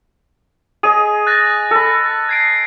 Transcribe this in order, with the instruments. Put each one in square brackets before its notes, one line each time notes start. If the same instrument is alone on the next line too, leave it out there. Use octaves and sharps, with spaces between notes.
[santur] G#4 D#5 [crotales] D#6 D#7
[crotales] F#6 A6 A#6
[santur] A4 B5
[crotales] G#6 C7 D7